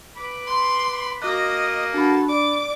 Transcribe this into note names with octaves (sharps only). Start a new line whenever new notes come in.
B4 B5 D6
C6
A#3 F#4 A#4 D#5 D6 F#6
D4 F#4 A4 B5
D5 D6